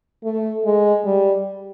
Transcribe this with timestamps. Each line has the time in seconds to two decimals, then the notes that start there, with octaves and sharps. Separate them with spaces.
0.24 A3
0.65 G#3
1.05 G3